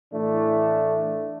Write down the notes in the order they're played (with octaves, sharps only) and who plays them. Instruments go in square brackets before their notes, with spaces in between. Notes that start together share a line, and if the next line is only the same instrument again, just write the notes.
[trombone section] A2 E3 A3 D4